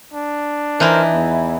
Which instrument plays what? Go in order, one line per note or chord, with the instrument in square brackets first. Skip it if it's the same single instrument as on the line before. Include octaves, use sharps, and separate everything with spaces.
[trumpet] D4
[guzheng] E3 D#4 E4 [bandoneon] A#4 C5
[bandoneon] E2